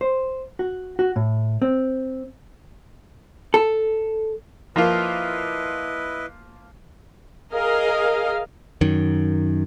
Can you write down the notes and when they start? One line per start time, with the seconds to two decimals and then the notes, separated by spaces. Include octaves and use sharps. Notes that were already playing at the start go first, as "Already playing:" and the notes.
0.01 C5
0.59 F#4
0.99 F#4
1.16 A2
1.62 C4
3.54 A4
4.76 F3 A#3 E4 F4 B4 D#5
7.52 G#4 A#4 D#5 F5
8.81 F#2 D#3